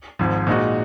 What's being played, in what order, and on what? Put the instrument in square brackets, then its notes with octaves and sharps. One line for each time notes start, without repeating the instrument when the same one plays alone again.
[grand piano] G#1 G#2 F3
A#2 G#3 D#4 F#4